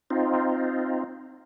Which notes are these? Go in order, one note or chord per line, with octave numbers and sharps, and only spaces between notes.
C4 D#4 F4